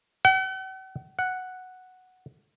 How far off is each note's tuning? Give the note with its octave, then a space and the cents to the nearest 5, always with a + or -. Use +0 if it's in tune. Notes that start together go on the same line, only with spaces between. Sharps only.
F#5 +45
F#5 +0